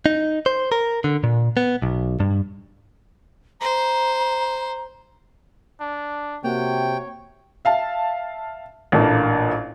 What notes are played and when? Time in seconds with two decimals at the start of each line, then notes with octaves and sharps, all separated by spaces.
0.06 D#4
0.46 C5
0.72 A#4
1.04 D3
1.24 A#2
1.57 B3
1.82 B1
2.20 G2
3.61 C5 A#5
5.80 D4
6.44 C3 A#3 F#4 C#5 F#5 G5
7.65 E5 F5 A5
8.92 A1 A#2 A3 A#3 D4